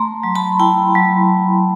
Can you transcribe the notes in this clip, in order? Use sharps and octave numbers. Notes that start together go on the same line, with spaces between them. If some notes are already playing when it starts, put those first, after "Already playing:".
Already playing: A3 A#5 C6
F#3
A5 B5
E4 G5 A5
F#3